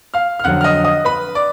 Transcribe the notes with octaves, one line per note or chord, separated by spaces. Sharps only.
F5 F6
F6
F2 D3 F#3 F#5 F#6
F6
D#5 D#6
D#5 D#6
B4 B5
D5 D6